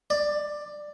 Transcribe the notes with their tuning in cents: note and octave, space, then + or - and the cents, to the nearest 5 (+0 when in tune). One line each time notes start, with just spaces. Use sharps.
D5 +10